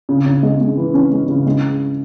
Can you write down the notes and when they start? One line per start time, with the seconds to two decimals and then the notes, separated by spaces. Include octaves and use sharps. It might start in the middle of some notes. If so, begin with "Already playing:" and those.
0.09 C#3
0.26 C#3
0.43 G#3
0.61 G#3
0.77 E3
0.94 C#4
1.12 G#3
1.28 C#3
1.46 G#3